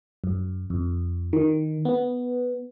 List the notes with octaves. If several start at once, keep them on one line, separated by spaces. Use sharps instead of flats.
F#2
F2
D#3
B3